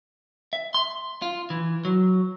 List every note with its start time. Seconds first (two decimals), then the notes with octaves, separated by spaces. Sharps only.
0.53 E5
0.74 C6
1.22 F4
1.50 E3
1.85 F#3